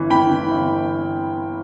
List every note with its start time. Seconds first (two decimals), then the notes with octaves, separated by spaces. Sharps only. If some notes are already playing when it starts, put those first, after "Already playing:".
Already playing: G1 E3
0.10 E3 G5 B5
0.31 E3
0.51 G1